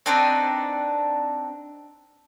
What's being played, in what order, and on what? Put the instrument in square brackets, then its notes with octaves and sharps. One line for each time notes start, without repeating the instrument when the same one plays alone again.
[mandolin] C4 D4 D#4 B4